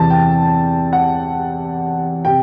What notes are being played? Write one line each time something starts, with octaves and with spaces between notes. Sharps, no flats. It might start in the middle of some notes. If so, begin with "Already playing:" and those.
Already playing: E2 C3 E3 A5
G5
F#5
C3 G5